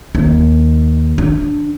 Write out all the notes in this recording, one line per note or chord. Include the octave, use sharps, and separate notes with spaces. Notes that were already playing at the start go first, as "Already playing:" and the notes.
D#2
D4